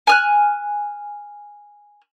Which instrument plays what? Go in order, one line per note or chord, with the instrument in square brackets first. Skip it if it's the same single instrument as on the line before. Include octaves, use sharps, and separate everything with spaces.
[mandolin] G#5 F6 F#6